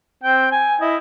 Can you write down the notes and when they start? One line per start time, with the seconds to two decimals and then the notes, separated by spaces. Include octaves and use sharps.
0.24 C4 G5
0.52 G#5
0.81 E4 D#5